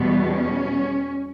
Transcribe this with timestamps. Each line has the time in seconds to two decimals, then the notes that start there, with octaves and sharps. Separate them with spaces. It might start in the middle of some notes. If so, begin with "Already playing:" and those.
Already playing: E2 B2 G3 B3
0.31 C#4